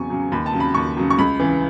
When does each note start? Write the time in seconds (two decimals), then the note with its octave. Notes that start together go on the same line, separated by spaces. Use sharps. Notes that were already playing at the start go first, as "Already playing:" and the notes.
Already playing: E2 C#3 F#3 G#5 C#6
0.10 C#3 F#3
0.32 D#2 B5
0.46 A5
0.53 C#3 F#3
0.60 B5
0.75 D#2 C#6
0.97 C#3 F#3
1.10 C#6
1.18 C#2 B5
1.40 C#3 E3